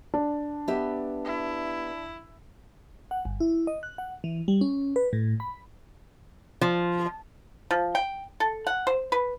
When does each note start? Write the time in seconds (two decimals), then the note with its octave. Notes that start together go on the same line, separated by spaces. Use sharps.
0.14 D4
0.68 B3 G4 E5
1.25 E4
3.11 F#5
3.25 G1
3.40 E4
3.67 D#5
3.83 F#6
3.98 F#5
4.24 E3
4.48 G3
4.61 C#4
4.96 B4
5.13 A2
5.40 B5
6.61 F3
7.71 F3
7.95 G5
8.40 A4
8.67 F#5
8.87 C5
9.12 B4